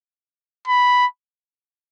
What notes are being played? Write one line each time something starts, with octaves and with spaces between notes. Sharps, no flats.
B5